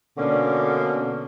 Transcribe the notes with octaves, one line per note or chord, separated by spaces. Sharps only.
B2 D3 A#3 C#4 D4